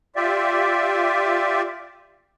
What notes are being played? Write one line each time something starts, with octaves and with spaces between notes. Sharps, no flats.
F4 G4 D5 E5